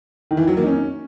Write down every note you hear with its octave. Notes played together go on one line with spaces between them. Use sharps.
D#3
E3
F#3
A#3
D#4
C#4